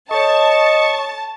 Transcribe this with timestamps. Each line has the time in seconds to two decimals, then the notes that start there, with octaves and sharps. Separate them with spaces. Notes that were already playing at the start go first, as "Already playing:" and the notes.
0.11 A4 C#5 D#5 A5 C#6